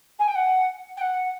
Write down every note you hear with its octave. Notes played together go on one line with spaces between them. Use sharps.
G#5
G5
F#5
G5
F#5